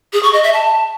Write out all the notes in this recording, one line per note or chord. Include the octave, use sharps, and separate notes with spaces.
G#4
C#6
D#5
E5
A5